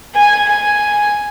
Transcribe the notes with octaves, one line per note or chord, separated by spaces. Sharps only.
G#5
G#5